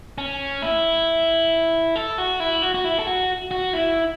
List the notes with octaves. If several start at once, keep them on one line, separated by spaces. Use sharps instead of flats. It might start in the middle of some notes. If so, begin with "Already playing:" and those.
C#4
E4
A4
F#4
E4
F#4
F#4
E4
A4
F#4
F#4
E4